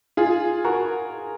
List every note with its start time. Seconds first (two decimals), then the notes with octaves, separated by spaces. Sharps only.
0.17 F4 G#4
0.65 F#4 A#4